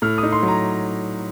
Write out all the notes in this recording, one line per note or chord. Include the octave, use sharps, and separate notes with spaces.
A2 F6
D#6
D#4
C6
F#3
A#5